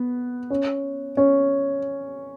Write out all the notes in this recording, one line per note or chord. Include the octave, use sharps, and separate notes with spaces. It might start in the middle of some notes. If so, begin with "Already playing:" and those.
Already playing: B3
C#4
C#4